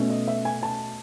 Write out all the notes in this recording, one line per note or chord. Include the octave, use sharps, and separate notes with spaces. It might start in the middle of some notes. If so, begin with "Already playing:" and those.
Already playing: B2 A3 C#4
D#5
E5
G#5
A5